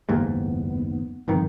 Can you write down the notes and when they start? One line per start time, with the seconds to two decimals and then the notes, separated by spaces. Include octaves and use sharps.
0.09 F#1 D#2 G#2 B3
1.28 G1 F2 D#3